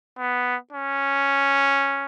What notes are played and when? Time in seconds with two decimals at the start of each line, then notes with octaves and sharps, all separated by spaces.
0.18 B3
0.73 C#4